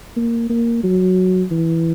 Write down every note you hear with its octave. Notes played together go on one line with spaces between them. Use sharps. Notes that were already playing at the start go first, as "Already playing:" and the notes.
A#3
A#3
F#3
E3